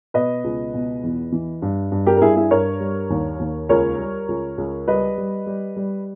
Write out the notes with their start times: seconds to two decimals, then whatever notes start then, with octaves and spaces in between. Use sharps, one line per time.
0.14 B2 B4 D#5
0.44 C#2
0.74 B2
1.03 E2
1.32 E3
1.62 G2
1.92 G2
2.06 G4 A#4
2.17 A#4
2.22 G2 E4 G#4
2.36 E4 G#4
2.51 G2 A#4 C#5
2.80 G3
3.10 D#2
3.39 D#2
3.69 C#2 A#4 C#5
3.99 G3
4.28 C#2
4.58 C#2
4.88 G3 B4 D#5
5.17 G3
5.46 G3
5.76 G3